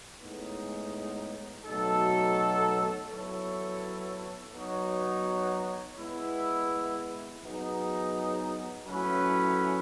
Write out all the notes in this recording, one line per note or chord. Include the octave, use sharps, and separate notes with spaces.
A2 G#3 B3 D#4
B2 F#3 A3 D#4 A4
F#3 B3 E4 A4 C#5
F#3 B3 D#4 F#4 C#5
G#3 B3 E4
F#3 B3 D#4 G#4
A2 F#3 C#4 E4 B4